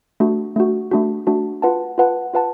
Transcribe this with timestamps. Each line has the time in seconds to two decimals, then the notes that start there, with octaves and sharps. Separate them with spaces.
0.20 A3 D4 F#4
0.56 A3 D4 F#4
0.91 A3 D4 F#4
1.27 A3 D4 F#4
1.62 F4 B4 F#5 A5
1.98 F4 B4 F#5 A5
2.34 F4 B4 F#5 A5